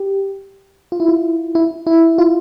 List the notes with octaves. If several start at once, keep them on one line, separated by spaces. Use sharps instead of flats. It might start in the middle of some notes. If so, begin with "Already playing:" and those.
Already playing: G4
F4
E4
F4
E4
E4
F4